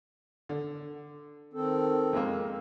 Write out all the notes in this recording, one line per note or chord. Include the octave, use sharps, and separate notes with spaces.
D3
D#3 C4 A4
F2 G#3 A#3